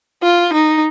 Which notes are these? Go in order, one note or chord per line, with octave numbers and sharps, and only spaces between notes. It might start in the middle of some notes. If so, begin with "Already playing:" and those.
F4
D#4